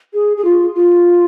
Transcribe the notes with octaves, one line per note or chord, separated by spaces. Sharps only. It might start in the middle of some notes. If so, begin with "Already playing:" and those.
G#4
G#4
F4
F4